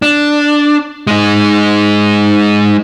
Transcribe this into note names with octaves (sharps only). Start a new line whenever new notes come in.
D4
G#3 D#4